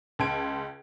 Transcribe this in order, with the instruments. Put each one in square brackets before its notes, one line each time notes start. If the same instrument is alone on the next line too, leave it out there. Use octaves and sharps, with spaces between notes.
[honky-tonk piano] C#2 A5 C6 G#6 D7